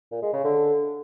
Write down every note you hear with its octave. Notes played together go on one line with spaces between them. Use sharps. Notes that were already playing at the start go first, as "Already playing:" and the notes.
A#2
G#3
C#3
D3